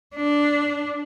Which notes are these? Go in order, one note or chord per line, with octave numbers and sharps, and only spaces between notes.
D4